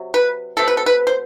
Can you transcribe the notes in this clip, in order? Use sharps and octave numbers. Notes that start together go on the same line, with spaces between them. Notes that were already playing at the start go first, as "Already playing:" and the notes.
Already playing: C3 F#3
B4
B2 A3 C4 A4
B4
A4
B4
C5